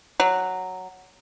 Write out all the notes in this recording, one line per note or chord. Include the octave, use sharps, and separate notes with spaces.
F#3